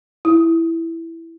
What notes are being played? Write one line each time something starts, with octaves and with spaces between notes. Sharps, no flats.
E4